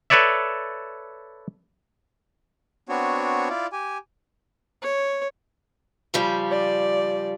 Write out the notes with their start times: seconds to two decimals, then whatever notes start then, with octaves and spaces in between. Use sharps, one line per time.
0.10 A4 B4 C#5 D5 E5
2.89 B3 C4 D4 F#4 C#5
3.49 E4 F4 D5
3.72 G4 G#5
4.82 C#5
6.14 C#3 F3 G3
6.51 D5